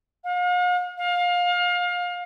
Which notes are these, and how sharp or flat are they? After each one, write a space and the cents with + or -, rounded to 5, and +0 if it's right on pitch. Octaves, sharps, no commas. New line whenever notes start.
F5 +45
F5 +25